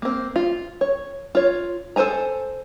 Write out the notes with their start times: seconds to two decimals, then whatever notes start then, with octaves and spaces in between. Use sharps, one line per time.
0.02 A#3 C4
0.36 F4
0.81 C#5
1.35 F4 C#5
1.96 A4 A#4 C5 G#5 A#5